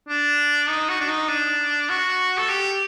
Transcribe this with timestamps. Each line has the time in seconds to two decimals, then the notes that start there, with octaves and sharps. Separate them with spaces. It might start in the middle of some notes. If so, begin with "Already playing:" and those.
0.09 D4
0.69 D#4
0.88 F#4
1.00 D4
1.09 D#4
1.28 D4
1.89 F#4
2.38 A4
2.49 G4